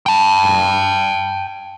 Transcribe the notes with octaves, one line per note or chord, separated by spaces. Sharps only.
G5 A5